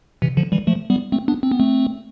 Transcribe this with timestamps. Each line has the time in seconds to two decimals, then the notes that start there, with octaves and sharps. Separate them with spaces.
0.22 C3 E3
0.37 D3 F3
0.52 E3 G3
0.67 F3 A3
0.90 G3 B3
1.12 A3 C4
1.28 B3 D4
1.43 C4
1.52 B3
1.60 A3 C4